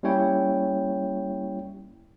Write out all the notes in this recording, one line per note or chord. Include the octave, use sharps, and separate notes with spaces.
G3 A#3 C#4 E4 C#5 G5